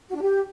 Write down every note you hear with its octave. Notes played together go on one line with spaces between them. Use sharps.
F#4
D4
G4